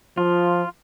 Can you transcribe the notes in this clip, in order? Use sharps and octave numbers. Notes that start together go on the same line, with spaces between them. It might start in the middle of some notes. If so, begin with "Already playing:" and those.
F3 F4